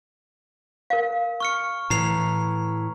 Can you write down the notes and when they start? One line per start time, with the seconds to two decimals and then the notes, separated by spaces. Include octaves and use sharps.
0.90 A#4 F5
1.40 C#6 F6 C#7
1.90 A2 E3 A#5 C7 F7